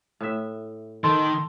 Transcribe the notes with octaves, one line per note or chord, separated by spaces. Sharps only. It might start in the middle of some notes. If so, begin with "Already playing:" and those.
A2 E5
D#3 A4 C6